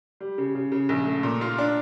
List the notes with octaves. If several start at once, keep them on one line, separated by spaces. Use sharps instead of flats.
G3
C#3
C#3
C#3
A#1
A3
A#2
F4
D4